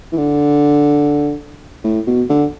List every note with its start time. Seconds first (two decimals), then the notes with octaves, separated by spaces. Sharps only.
0.12 E3
0.17 D3
1.84 A2
2.07 B2
2.29 D3